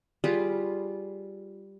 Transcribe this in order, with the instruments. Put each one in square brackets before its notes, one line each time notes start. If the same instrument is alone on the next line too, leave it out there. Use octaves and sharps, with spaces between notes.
[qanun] G3 F4 G#4 B4